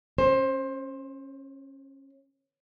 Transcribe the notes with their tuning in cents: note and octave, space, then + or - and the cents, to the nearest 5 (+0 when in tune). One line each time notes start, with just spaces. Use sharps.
C#4 -25 C5 +20